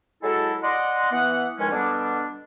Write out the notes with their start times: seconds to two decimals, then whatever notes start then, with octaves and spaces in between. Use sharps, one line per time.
0.23 F#3 G#3 E4 F#4 A4
0.63 D5 D#5 F#5 C6
1.12 E3 B3 F#5
1.58 C#2 D#3 F3 G#3 C#4 G#5
1.71 B2 D3 G3 B3 D4